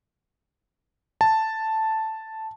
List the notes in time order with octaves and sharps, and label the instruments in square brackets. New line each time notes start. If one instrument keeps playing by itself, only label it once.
[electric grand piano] A5